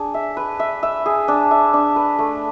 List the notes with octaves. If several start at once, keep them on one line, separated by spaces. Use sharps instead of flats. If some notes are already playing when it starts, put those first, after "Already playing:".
Already playing: D4 G#4
E5
B4
E5
E5
G#4
D4
E5
D4
B4
A3